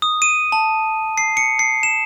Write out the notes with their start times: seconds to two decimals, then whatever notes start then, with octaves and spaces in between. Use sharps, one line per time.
0.02 D#6
0.22 D#7
0.52 A5
1.18 C7
1.37 C#7
1.59 C7
1.83 E7